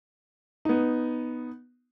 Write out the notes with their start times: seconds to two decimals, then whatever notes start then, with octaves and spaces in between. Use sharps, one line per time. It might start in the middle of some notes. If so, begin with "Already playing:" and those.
0.65 B3 D#4